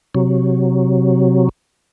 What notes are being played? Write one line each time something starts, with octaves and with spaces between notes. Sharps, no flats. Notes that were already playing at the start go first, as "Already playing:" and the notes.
C3 F#3